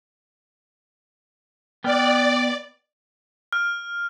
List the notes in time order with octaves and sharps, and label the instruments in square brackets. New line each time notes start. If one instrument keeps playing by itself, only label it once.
[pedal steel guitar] B3 G5 F6 [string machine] D5
[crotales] F6